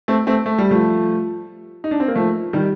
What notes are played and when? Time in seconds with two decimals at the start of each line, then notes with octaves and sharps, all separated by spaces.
0.08 A3 C4
0.27 A3 C4
0.46 A3
0.58 G3
0.71 F3 A3
1.84 D#4
1.91 D4
2.00 C4
2.08 A#3
2.15 F3 A3
2.53 D#3 G3